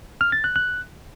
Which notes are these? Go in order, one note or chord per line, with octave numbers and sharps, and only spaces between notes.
F6
A6
F#6
F#6